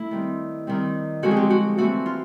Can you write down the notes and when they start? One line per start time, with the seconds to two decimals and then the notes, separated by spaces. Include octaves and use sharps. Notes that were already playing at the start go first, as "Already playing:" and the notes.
Already playing: A3 E4
0.11 D#3 G3 C4
0.67 D#3 G3 C4
1.23 D3 F3 G#3 C4 F#4
1.31 G#4
1.37 G4
1.50 F#4
1.78 E3 A3 C4 F#4
2.06 F4